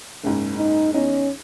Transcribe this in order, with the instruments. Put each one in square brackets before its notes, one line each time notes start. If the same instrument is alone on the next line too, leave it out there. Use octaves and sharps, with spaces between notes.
[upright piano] F#1 C#2 G#2
[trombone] D#4
[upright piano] E2 D#4 [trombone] C#4